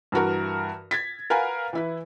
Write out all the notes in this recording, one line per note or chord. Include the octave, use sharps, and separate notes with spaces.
G2 E3 F#4 A#4
G#6 A6 B6
A#4 B4 F5 F#5 G#5 A#5
E3 E4 B4